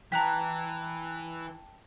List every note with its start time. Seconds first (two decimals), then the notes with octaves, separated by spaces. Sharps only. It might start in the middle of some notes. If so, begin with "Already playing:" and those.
0.12 E3 G5 A5 A#5 F#6 B6